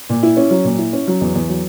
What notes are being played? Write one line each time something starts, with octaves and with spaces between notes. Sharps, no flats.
A#2
E4
C#4
F#3
A#2
E4
C#4
F#3
E2
E2
F#3